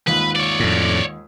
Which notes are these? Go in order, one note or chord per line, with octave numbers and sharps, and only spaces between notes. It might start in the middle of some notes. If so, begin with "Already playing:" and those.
D#2 G#2 F4 B4
C#5 D5
F2 A2